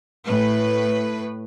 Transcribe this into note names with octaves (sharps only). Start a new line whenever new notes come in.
A2 B4